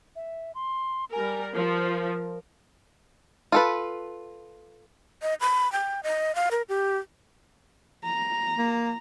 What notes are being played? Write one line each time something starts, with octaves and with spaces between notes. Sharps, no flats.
E5
C6
G3 A#4 G#5
F3 A#4
F4 A4 B4
D#5
B5
G5
D#5
F5
A#4
G4
A#5
A#3